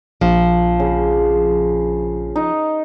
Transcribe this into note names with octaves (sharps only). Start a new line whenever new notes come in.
A#1 F3
C#3
D#4